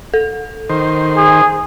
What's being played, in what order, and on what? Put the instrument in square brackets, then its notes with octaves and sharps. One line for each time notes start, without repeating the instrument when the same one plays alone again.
[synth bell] A4
[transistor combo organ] D#3 C5
[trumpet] G#4